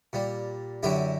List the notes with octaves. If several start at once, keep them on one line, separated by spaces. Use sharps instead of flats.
A#2 G3
F#2 D3 F#3 E4 G4